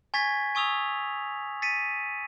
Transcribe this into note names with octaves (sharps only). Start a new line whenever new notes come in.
G#5 C#6 G#6 A6 B6
G#5 C#6 D#6 E6 F7
A6 B6 C#7 D#7